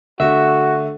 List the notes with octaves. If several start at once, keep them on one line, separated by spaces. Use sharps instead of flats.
D3 A3 F#4 E5